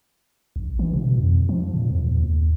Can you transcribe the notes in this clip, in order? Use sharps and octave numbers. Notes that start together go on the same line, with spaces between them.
A#1
E3
B2
F2
F3
A#2
E2
D#2